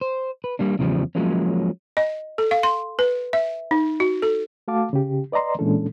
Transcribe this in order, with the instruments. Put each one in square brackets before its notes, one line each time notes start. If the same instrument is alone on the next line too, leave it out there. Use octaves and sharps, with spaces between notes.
[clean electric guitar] C5
B4
G3 A#3 D4
E2 C#3 F3 G3
F3 F#3 G#3 A#3 C#4
[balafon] D#5
A4
F5
C6
B4
E5
D#4
F#4
A4
[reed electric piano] A3 F#4 F5 A5 D6
C#3 G4
B4 D5 D#5 A#5 C6
A#2 E3 G#3 C#4 D4 A4